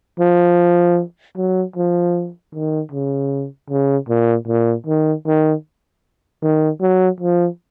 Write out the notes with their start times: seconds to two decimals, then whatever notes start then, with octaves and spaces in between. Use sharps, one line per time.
0.20 F3
1.37 F#3
1.76 F3
2.54 D#3
2.92 C#3
3.70 C#3
4.09 A#2
4.48 A#2
4.86 D#3
5.26 D#3
6.42 D#3
6.81 F#3
7.21 F3